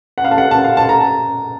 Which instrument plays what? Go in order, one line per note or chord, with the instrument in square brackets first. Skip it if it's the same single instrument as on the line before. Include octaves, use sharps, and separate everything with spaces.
[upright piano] F#5
F5
A5
F#5
A5
F5
A5
A#5
A5